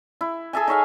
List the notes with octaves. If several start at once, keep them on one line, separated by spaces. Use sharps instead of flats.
E4
G#4 A4 E5 G#5
D#4 C#5 E5 F5